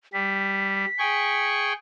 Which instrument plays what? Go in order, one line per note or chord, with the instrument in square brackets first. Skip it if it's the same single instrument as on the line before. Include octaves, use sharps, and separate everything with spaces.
[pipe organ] G3 [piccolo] B6
[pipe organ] G#4 G5 C#6